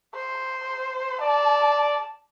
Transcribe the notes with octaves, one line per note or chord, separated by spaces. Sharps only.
C5
D5 A5